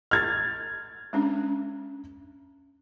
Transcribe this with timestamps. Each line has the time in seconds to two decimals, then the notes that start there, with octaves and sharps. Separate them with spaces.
0.11 F6 G#6 A6
1.13 G#3 C#4 D4